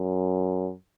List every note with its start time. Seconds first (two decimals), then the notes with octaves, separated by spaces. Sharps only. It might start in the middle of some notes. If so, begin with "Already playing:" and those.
Already playing: F#2